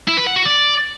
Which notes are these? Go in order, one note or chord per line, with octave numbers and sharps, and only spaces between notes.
E4
B4
F#5
F#4
D5